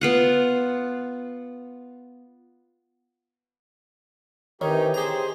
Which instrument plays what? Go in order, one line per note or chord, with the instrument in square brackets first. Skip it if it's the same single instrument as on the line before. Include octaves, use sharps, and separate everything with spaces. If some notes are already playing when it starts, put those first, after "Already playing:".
[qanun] B3 F4 F#5
[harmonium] C3 E3 G4 [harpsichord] D#3 [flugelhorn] D#4 [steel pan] C#5
[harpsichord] G4 A#5 [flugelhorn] G#4 [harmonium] C5